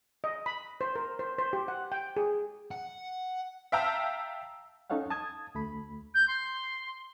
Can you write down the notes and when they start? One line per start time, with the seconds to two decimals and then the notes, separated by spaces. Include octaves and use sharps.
0.24 D#5
0.46 B5
0.81 C5
0.95 A#4
1.19 C5
1.39 C5
1.53 G4
1.68 F#5
1.92 G5
2.17 G#4
2.71 F#5
3.72 E5 F5 G5 A5 A#5 E6
4.90 C#4 D#4 A4 C#5 F5 F#5
5.10 A5 D#6 G#6
5.55 D2 A3 B5
6.14 G6
6.28 C6